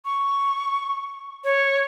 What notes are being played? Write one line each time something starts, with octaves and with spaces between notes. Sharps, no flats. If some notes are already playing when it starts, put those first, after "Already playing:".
C#6
C#5